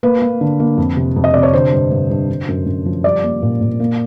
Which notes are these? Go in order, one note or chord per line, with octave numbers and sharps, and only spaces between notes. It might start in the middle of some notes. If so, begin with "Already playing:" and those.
A#3 B4
A#3
D3
A#3
F2
C3
F2
D#5
C3 D5
C#5
D3 C5
G2
G2
G2
D3
F#2
F#2
F3
G3 D5
A#3
A#2
A#2
A#3